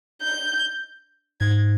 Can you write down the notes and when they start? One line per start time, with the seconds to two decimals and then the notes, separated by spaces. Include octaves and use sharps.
0.22 G6
1.41 G#2 G#6